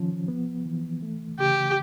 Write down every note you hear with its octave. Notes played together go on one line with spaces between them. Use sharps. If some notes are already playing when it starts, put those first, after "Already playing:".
Already playing: D#3 F3 C#4
B3
E3
A3
C#3 G4